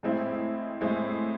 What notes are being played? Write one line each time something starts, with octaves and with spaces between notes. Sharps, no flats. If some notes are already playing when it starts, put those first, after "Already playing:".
A2 G#3 C4 E4
A2 G#3 C4 E4